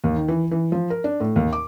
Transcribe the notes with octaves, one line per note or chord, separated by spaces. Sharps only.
D#2
D#3
E3
E3
F3
A#4
D4
A2
D#2
D6